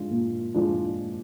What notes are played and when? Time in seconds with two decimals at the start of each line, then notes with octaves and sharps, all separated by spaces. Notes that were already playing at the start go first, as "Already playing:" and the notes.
Already playing: F3 G#3 D4 F4
0.11 A#2
0.54 F3 G#3 D4 F4